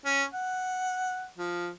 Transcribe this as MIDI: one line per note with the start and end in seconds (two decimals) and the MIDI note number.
0.05 0.24 61
0.33 1.26 78
1.38 1.69 53